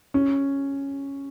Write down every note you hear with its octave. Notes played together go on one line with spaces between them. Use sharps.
C#4